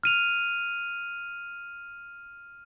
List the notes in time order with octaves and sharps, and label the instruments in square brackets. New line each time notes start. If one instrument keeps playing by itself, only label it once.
[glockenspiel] F6 D#7 F7